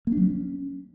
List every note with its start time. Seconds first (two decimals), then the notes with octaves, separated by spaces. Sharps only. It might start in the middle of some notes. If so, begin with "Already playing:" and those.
0.07 A#3
0.12 D4
0.17 F#3
0.22 C#4